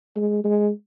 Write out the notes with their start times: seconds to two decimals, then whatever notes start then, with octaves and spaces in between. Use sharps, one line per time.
0.16 G#3
0.44 G#3